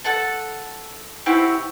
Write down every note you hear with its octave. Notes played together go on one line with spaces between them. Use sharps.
A4 F#5 A5
C4 E4 F#4 G4